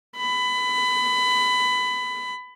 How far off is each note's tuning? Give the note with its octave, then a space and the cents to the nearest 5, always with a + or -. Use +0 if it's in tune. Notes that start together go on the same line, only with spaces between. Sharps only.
B5 +20